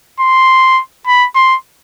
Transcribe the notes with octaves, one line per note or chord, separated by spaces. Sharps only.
C6
B5
C6